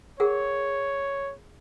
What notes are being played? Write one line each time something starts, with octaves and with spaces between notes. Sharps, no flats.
G#4 A#4 C#5 F#5